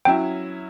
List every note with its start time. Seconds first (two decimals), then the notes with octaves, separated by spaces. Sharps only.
0.05 F#3 C#4 E4 G5